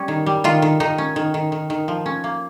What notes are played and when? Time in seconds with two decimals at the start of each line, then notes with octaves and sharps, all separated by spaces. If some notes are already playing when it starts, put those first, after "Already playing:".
Already playing: G3 C#4
0.08 D#3
0.26 G3
0.44 D#3 F4
0.62 D#3
0.80 D#3 D#4
0.98 C#4
1.16 D#3
1.34 D#3
1.52 D#3
1.70 D#3
1.88 F3
2.06 C#4
2.24 A#3